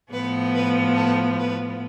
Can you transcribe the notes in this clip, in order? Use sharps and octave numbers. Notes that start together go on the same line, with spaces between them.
A2 F3 B3 B4
B4
A4
B4